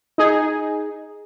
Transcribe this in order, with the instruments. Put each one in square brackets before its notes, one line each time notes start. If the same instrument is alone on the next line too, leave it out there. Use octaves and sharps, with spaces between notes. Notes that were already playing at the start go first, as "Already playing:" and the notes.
[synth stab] D#4 G#4